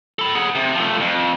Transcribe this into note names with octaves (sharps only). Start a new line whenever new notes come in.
A4 B5
G#4 F#5
C3
F3 A3
F2